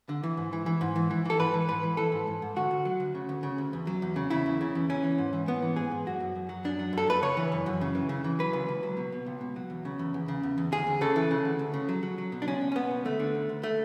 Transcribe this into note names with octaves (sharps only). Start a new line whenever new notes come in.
D3
E3
G#2
E3
E3
G#2
E3
E3
E3 A4
G#2 B4
E3
G#2 B4
E3
E3 A4
G#2
G#2
G#2
D2 F#4
D2
F#3
D2
C#3
D2
C#3
D2
E2
F#3
E2
C#3
C#3 E4
E2
C#3
E2
E3 C#4
E3
G#2
E3
G#2 B3
E3
G#2 G#4
G#2
F#2 F#4
F#2
F#2
F#3
F#2 D4
F#3
F#2 A4
F#2 B4
C#3 C#5
E3
F#2
F#2
C#3
E3
C#3
E3
F#3 B4
C#2
C#2
F#3
B2
B2
C#2
B2
F#3
E2
C#3
E2
E2
C#3
E2
E2
D2 G#4
D2
C#3 A4
E3
C#3
D2
D2
C#3
F#3
F#3
F#3
B2
D4
C#2 C#4
C#2
C#4
C#2 B3
B2
D2 A3
D3
D2
D2
A3